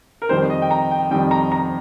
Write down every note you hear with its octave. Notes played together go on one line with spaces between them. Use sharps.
A#4
F2 D#3 G3 C5
D#5
G5
A#5
G5
F2 D#3 G3 G5
A#5
A#5